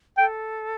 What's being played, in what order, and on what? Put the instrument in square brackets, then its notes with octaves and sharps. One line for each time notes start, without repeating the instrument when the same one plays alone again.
[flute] A4 [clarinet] G5